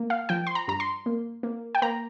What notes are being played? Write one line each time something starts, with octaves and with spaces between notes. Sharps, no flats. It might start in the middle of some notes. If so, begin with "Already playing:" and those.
Already playing: A#3
F5
F3 G5
C6
A#5
G2 A#5
C6
A#3
A#3
G5
A#3 A#5